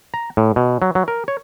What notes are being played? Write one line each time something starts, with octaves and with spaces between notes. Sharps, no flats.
A#5
A2
B2
F#3
F#3
A#4
C#5